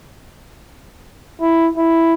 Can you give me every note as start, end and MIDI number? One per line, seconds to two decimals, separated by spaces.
1.41 1.69 64
1.77 2.14 64